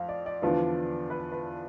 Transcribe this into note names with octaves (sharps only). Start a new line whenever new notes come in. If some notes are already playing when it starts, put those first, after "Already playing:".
Already playing: F2 F5
D5
D5
E2 D3 F3 B3 F4
B4
B4